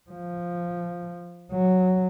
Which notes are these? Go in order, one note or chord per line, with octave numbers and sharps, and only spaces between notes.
F3
F#3